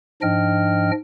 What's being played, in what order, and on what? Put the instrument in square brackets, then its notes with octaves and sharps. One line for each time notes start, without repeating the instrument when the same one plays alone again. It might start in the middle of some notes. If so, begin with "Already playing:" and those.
[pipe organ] G#2 F3 D4 D#5 G5 F6